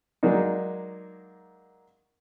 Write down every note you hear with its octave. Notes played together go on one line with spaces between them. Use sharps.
F#3 G#3 A#3 D4 D#4